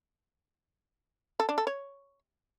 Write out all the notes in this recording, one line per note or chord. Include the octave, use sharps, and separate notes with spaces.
A4
D4
A4
C#5